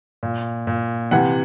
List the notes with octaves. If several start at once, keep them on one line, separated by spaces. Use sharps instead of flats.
A#2
A#2
C3 E3 F#5